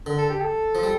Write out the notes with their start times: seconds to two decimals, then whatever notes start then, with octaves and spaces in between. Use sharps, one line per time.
0.06 D3
0.18 A4
0.30 G4
0.41 A4
0.75 F3
0.83 G3